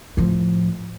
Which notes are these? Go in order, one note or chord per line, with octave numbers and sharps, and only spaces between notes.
A2 F3